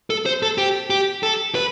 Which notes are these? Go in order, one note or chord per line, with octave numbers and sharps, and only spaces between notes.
A4
C5
A4
G4
G4
A4
B4